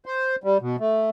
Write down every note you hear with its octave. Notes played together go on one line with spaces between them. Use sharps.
C5
G3
B2
A3